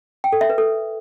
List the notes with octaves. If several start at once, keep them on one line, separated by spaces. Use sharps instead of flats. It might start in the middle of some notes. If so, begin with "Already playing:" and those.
G5
A4
E5
B4
A4